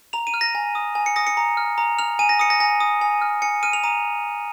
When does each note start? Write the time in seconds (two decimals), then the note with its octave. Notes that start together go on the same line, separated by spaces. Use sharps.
0.13 A#5 F7
0.27 D#7
0.34 F6
0.41 A#6
0.55 G#5
0.75 D#6
0.95 G#5
1.06 C#7
1.16 D#6 A#6
1.27 C#7
1.37 A#5
1.57 F6
1.78 A#5
1.98 F6 F7
2.19 G#5 D#7
2.29 A#6
2.39 D#6 C#7
2.50 A#6
2.60 G#5 A#6
2.80 D#6
3.01 G#5
3.22 F6
3.42 G#5 C#7
3.63 F6 D#7
3.73 F7
3.84 A#5 D#7